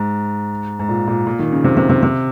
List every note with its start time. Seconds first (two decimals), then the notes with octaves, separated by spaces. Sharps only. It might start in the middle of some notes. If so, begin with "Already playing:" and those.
Already playing: G#2
0.79 G#2
0.89 A#2
1.07 A#2
1.27 A#2
1.39 D#3
1.52 C#3
1.64 C3
1.77 C3
1.89 C3
2.03 C3